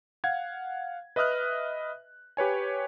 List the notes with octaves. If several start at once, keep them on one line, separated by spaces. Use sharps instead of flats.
F5 F#5 G#6
B4 D#5 E5 D#6 F6 F#6
G4 B4 C#5 G#5